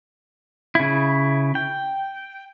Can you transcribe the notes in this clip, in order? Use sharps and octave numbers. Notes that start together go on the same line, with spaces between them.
C#3 E4
G5